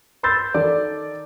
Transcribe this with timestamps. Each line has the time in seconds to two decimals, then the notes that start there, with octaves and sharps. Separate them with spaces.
0.23 B5 C6 E6 G6 A6
0.54 D#3 A4 D5